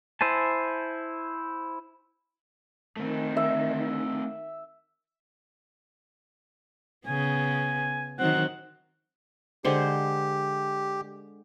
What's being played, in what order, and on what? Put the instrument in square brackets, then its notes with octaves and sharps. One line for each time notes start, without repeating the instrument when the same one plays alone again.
[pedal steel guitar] E4 C5 G#5 A5
[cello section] D#3 [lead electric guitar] A3 C4
[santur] E5
[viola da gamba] C#3 B3 [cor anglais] G#5
[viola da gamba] D#3 F#3 C4 [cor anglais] F#5
[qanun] D3 G#3 C5 [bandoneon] G4